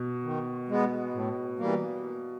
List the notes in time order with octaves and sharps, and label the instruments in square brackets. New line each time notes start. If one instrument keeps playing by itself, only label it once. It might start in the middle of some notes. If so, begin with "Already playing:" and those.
Already playing: [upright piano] B2
[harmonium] D#3
G#3 B3
A2
E3 G3 A#3